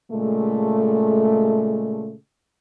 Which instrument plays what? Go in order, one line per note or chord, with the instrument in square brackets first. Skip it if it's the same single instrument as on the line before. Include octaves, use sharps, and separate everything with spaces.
[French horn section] A#2 C#3 G#3 A3